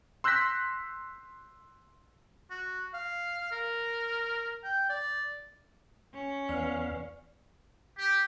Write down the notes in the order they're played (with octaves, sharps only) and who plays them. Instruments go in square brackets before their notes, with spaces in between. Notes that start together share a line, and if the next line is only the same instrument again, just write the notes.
[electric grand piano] C6 E6 F#6 G6 A#6 B6
[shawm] F#4
F5
A#4
G5
D5
[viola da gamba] C#4
[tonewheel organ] E2 B3 F5 [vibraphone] D5
[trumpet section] G4